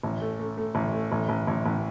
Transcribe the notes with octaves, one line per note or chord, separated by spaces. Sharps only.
A1
A3
A3
A3
A1
A3
A1
A1
A1
A1